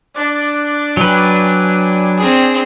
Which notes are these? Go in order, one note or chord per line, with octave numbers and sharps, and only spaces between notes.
D4 D6 F#6 A6
F#3 B4 D5 G5 G#5
C4 G#4